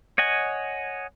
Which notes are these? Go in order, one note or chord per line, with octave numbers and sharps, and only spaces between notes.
C#5 D#5 F#5 G#5